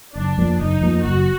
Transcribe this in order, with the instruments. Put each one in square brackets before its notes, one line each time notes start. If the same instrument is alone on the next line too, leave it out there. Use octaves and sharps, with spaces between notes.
[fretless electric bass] F#1 [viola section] D4
[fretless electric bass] F2 F3 A#3
[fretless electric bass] F#1 [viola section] D#4
[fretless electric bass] F2 F3 A#3
[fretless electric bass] F#1 [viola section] F#4